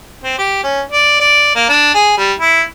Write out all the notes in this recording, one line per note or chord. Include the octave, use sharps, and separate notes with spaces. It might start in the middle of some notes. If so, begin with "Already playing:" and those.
C4
G4
C#4
D5
D5
A#3
D4
G#4
G3
E4